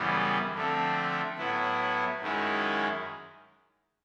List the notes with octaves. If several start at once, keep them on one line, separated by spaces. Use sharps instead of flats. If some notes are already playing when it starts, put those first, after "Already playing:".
Already playing: F#2 C#3 E3 G3 B3
D3 F3 A3 C4
A2 F#3 B3 E4
F#2 D#3 G#3 C#4 E4